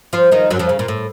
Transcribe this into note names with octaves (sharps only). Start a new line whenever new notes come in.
F3 F4
D#3 D#4
F#2 F#3
F2 F3
C#3
A#2
A2